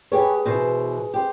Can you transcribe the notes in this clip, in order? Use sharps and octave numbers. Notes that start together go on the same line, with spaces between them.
G4 G#4 B4 C#5
B2 E3 C5
G4 C5